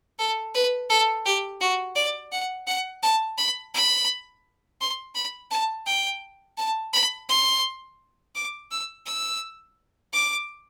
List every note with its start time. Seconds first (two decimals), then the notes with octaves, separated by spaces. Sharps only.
0.19 A4
0.54 B4
0.90 A4
1.25 G4
1.61 F#4
1.96 D5
2.32 F#5
2.67 F#5
3.03 A5
3.38 B5
3.74 B5
4.81 C6
5.15 B5
5.51 A5
5.86 G5
6.58 A5
6.93 B5
7.29 C6
8.35 D6
8.71 E6
9.06 E6
10.13 D6